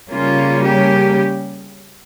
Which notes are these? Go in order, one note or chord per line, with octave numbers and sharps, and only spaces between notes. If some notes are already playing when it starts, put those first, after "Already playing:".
C#3 G3 A#3 C#4 F4
G4